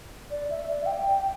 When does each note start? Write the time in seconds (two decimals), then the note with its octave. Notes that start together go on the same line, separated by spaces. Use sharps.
0.31 D5
0.50 E5
0.68 D5
0.81 E5
0.86 G5